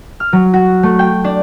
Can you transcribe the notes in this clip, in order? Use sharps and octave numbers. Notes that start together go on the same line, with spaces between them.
F6
F#3
F#4
A3
G5
D4